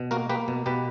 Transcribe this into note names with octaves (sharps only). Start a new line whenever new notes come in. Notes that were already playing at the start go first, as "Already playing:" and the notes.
Already playing: B2
A#3 F#4 A#4
A#3 G4 B4
B2
B2 G4 B4